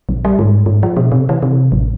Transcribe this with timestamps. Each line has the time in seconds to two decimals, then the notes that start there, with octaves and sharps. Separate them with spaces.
0.09 A#1
0.25 G3
0.39 G#2
0.66 G#2
0.83 F3
0.97 B2
1.12 C3
1.29 E3
1.42 C3
1.72 A1